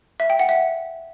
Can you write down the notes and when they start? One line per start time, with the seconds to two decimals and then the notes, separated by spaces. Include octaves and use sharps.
0.20 E5
0.30 G5
0.39 F#5
0.49 E5